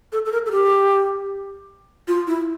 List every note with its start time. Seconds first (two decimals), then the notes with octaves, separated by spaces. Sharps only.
0.13 A4
0.25 A4
0.32 A#4
0.46 A4
0.52 G4
2.08 F4
2.27 E4